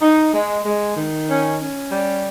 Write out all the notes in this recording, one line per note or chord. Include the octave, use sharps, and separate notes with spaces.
D#4
G#3
G#3
D#3
C#4
C#4
G3